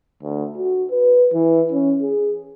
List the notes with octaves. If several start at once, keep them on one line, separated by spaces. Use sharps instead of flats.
D2
F#4
B4
E3
C#4
G#4